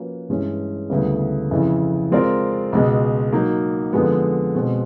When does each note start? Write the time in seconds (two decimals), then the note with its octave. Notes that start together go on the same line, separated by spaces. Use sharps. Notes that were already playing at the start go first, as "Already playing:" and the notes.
Already playing: F3 A#3 C#4 F#4 B4
0.29 G2 E3 G#3 C#4
0.90 D2 C#3 E3 G3 B3
1.51 F2 C#3 E3
2.12 G#3 C4 F4 A#4 D5
2.72 C#2 B2 G#3
3.33 F#3 A#3 D#4
3.93 F2 D3 F3 G#3 B3
4.55 B2 G#3 C4